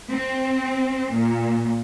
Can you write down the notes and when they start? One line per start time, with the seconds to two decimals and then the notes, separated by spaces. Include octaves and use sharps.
0.12 C4
1.15 A#2